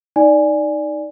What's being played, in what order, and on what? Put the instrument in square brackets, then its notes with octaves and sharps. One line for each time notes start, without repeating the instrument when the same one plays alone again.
[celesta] D#4 D5 G#5